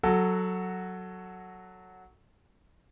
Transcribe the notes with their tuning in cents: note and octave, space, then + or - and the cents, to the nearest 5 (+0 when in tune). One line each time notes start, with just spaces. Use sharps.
F#3 +0 F#4 +0 A4 +5